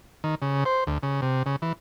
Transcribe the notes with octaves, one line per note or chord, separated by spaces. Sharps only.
D#3
C#3
C5
D2
C#3
C3
C#3
E3